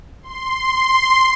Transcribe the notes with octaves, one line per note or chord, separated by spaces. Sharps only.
C6